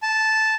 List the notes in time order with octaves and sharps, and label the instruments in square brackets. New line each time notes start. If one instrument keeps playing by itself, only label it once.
[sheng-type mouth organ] A5